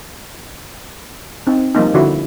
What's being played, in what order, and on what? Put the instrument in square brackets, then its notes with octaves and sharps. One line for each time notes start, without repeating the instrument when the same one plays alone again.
[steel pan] C4 D#4
F3 G3 A#3 D#4
D3 F3 E4 F#4